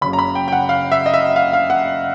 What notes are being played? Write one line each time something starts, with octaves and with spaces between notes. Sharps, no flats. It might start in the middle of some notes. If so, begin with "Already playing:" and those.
F#1 F#2 C#3 B5
A#5
B5
G5
G5
F#5
F5
E5
D#5
E5
F5
F5
F#5